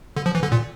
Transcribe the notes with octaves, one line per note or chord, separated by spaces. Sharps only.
D3
F3
E3
D3
A#2